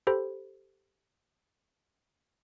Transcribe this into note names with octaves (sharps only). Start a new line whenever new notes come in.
G4 A4 C5 B5